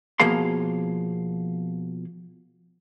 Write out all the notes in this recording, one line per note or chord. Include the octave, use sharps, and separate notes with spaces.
B2 F3 A#3 G#4 F5 C6